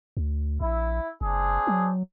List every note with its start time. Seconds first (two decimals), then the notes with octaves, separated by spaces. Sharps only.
0.17 D2
0.60 A#1 E4
1.21 F#1 C4 D4 G#4
1.67 F#3